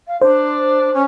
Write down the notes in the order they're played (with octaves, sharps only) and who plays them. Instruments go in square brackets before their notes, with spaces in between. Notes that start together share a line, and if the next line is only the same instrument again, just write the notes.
[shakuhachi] F5
[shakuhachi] D4 [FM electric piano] C5
[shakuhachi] C#4